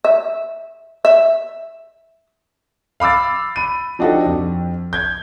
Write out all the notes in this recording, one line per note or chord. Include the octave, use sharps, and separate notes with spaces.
E5
E5
F5 B5 D6 E6 A6
B5 D#7
F3 D4 D#4 F#4 G4 A4
F2
G6 G#6